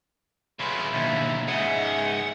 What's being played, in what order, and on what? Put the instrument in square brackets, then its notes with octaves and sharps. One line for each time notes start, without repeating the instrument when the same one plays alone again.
[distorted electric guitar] C#3 B4 [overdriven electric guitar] F#3 E4 [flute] C6
[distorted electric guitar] D#2 [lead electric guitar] B2 D3 [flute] E5
[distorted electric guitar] G#2 C#3 [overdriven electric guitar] G#3 G#4 [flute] E5 [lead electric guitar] F#5